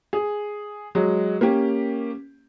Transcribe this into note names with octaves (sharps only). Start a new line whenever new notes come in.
G#4
F#3 G#3
A#3 C#4 G4